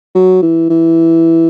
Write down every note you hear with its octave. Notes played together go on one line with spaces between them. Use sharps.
F#3
E3
E3